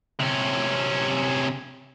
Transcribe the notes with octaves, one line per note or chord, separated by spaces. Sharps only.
C3 C#4